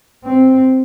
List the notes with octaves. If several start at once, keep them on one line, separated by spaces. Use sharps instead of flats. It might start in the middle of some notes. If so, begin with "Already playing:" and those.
C4